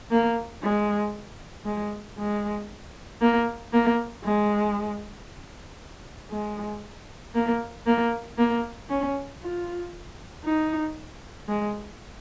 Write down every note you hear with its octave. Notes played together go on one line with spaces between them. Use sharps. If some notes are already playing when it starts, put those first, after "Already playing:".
A#3
G#3
G#3
G#3
A#3
A#3
G#3
G#3
A#3
A#3
A#3
C#4
F4
D#4
G#3